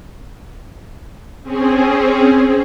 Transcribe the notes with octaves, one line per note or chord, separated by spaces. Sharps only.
C4 C#4 G#4